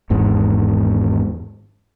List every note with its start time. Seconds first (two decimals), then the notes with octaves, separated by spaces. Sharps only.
0.10 G#1 E2 G#2